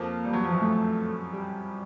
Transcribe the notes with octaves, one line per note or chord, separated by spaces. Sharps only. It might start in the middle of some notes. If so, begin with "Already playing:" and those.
Already playing: F2 F3 A#3
G3
F#3
F3
F#2 F#3
A3
G3